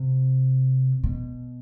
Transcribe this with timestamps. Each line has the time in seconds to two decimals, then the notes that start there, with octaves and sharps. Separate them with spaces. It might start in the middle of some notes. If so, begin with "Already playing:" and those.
Already playing: C3
1.04 B2